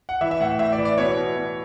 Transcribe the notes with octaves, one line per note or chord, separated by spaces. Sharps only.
F#5
E3 E5
E5
A2 F#5
A2 E5
D5
E3
D5
B2 C#5
B2
B2